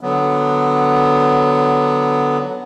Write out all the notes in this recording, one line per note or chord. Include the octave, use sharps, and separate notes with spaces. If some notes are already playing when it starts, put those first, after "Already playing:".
D3 F#3 B3